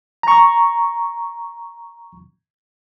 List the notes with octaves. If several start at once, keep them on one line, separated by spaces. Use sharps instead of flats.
A#5 C#6